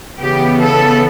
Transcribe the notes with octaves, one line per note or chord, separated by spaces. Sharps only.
C#3 E3 B3 G4
A4